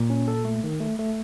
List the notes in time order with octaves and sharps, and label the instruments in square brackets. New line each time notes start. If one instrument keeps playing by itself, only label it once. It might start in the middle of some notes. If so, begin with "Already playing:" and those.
Already playing: [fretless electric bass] A#2
[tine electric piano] C#4
A4
A3
D#3
A3
A3